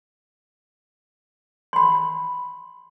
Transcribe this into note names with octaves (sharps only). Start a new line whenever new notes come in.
B5 C6